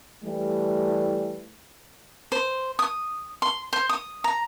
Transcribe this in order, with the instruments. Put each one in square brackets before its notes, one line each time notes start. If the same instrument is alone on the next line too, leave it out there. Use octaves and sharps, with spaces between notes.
[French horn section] E3 G3 A3
[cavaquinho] C5
D#6
C6
C5
D#6
A#5